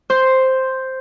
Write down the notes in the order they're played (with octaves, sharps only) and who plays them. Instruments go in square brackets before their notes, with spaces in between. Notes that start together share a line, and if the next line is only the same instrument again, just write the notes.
[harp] C5